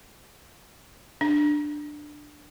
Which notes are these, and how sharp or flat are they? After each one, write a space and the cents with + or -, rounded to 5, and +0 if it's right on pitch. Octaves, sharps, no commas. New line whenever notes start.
D4 +15